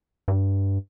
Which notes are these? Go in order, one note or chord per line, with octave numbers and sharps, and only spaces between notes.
G2